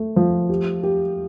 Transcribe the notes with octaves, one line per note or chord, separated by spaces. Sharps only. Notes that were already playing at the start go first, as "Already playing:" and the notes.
Already playing: A3
F3
G4
G4